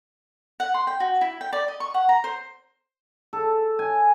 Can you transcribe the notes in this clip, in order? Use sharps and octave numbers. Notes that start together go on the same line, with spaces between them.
F#5
C6
G5
F#4
E4
G5
D5
D#5
C#6
F#5
A#5
C5
A4
G#5